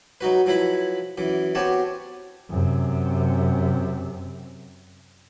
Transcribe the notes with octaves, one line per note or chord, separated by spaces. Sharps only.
F#3 D#4 F#4 B4
F3 F#3 E4 B4 B5
F#2 E3
B3 C4 F#4 G4 C#5 A5
F#2 C3